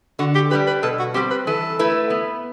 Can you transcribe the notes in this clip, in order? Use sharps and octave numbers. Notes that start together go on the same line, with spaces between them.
D3 F#4
G4
G3 D4 G4 B4
B4
B2 A4
F#4
G3 C4 G4
B4
E3 A4
A3 E4 B4
B3